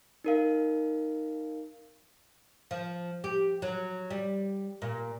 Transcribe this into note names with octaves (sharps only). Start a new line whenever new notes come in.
D#4 A#4 F5
F3
G4
F#3
G3
A#2